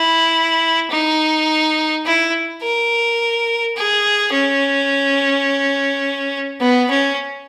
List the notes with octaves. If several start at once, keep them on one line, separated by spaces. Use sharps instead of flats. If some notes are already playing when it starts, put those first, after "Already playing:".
Already playing: E4
D#4
E4
A#4
G#4
C#4
B3
C#4